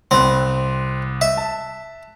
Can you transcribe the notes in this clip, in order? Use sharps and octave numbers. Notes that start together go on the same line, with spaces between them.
C2 C4 B5 F#6
E5
A5